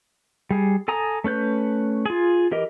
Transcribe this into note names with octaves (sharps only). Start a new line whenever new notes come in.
G3 G#4
A4 G#5 A#5 D#6
A3 C#4 B4 G6
F4 G#4
E3 G4 A#4 D#5